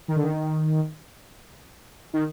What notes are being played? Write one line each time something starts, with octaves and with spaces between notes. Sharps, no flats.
D#3
D3
D#3
D#3